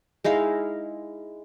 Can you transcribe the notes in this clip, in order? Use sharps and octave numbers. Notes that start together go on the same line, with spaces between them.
G#3 D#4 E4 F5